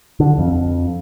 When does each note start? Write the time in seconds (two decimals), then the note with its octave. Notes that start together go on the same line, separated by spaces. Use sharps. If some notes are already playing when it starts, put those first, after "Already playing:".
0.20 D3
0.38 F2